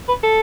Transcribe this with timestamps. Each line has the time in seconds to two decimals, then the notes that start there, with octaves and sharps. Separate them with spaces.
0.08 B4
0.23 A4